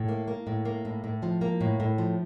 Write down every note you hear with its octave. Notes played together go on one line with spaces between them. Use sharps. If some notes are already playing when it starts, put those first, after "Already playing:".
Already playing: A2
A#3
A#3
A2
A#3
A2
A2
F3
A#3
A2
A2
F3